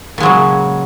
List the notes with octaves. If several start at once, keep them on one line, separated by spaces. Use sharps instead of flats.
A#2 C#3 F#3 G#3